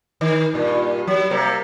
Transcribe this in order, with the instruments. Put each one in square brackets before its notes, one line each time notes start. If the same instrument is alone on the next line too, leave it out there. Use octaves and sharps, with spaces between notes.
[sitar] D#3
G2 A#2
F#3
C3 G3 A#3